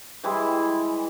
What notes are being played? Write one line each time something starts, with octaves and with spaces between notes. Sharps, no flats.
E3 G3 G#3 E4